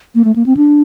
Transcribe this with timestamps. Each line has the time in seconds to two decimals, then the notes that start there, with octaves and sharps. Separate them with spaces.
0.15 A#3
0.25 A3
0.36 A#3
0.46 C4
0.57 D4